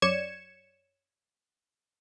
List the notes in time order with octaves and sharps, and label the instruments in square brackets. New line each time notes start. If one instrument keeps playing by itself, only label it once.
[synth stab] F#2 C#5 D5 G#6 C#7 E7